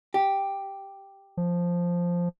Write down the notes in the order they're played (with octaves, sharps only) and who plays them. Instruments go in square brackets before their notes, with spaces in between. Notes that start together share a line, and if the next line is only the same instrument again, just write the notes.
[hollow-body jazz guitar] G4
[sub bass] F3